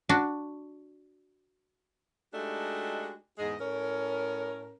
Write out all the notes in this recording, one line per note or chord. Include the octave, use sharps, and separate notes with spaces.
D4 F#4
G#3 A3 D4 D#4 F#4 G4
E2 G#2 G#3 G#4 D#5
A2 C#4 A#4